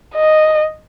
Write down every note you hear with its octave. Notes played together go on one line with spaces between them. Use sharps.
D#5